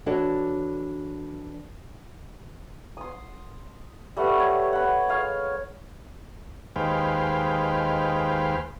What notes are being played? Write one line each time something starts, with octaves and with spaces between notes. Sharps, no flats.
E3 D4 F#4 A4 C#5 D5
C6 D#6
G3 A3 B4 F#5
C#5
F#5 B5
G#3 C#5 F5 D#6
D#2 G#3 B4 C5 F5 G5